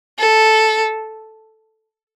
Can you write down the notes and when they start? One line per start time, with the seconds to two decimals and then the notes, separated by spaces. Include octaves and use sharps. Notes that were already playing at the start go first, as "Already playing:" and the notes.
0.19 A4